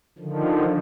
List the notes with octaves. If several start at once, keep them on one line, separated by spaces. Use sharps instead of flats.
D3 D#3 F3